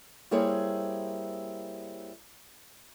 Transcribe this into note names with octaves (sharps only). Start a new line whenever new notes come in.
G3 A#3 E4 G#4 C5 C#5